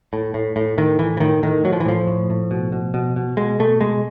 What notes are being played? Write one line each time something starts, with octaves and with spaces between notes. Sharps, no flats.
A2
A2
A2
A2 D#3
A2 E3
E3
A2 D#3
A2 D#3
A2 F#3
F3
E3
A2 F3
A2
A2
B2
B2
B2
B2
B2 G#3
B2 A3
B2 G#3